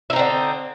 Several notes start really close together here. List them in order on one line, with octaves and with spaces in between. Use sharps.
E4 D#4 C4 D3